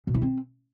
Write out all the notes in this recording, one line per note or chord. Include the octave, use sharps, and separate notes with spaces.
B2
E4
C4